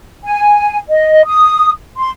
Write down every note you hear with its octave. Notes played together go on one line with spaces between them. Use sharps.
G#5
D#5
D#6
C6